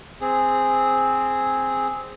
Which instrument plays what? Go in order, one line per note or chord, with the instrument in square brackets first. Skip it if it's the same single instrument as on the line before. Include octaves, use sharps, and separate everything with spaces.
[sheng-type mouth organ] C4 G#4